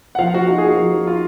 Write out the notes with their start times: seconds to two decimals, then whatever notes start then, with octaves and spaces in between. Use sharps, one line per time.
0.15 F#5
0.19 F3 F5
0.34 F3 F#4
0.48 D#4 F#4
0.58 G#4
0.63 A#3
0.68 F#4
0.78 F3
0.93 F3
1.07 D#4 F4